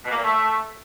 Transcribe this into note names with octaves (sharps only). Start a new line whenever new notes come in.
B2
A#3
A#2
A3